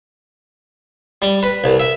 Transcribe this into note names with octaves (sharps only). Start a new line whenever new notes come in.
G3
B4
C2
E5